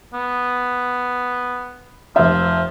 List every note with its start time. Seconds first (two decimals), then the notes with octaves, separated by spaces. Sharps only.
0.13 B3
2.16 F1 F3 E5